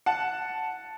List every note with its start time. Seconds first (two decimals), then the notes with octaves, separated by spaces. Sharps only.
0.06 F#5 A5